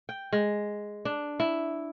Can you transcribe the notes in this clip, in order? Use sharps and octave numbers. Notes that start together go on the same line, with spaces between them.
G5
G#3
D4
E4